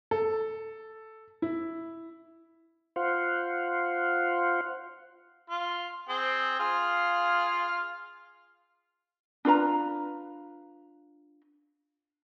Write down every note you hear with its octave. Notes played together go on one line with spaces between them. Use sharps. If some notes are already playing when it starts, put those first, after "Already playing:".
A4
E4
F4 C5 F5 F#5
F4
C4 G#4 G5
F4 G#4 F5
D4 F4 B4 A#5